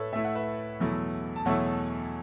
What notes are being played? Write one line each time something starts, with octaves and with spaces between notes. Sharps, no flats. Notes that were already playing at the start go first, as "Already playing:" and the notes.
Already playing: A2 A3 A4 B4 C#5 E5
A2 A3 E4 E5
F#5
B4 E5
E2 B2 F#3 A3 E4
A5
E2 B2 F#3 A3 E4 C#5 F#5